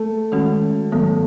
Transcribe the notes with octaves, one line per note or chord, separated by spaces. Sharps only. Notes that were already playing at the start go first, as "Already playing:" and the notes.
Already playing: A3
D#3 G#3 C#4 F#4
G#2 D#3 F#3 A3 B3